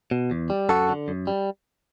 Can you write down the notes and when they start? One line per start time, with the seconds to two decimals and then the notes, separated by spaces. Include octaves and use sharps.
0.11 B2
0.31 E2
0.50 G3
0.69 F#2 F#4 A4
0.89 D3
1.08 F#2
1.27 G3